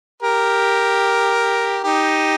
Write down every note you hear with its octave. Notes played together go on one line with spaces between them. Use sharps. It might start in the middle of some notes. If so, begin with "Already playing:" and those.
G4 A#4
D#4 G4